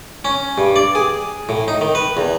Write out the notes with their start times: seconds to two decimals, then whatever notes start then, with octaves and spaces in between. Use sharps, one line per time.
0.25 C#4
0.58 G2
0.76 D5
0.95 G#4
1.49 A2
1.68 D#4
1.81 D#3
1.95 B4
2.17 E2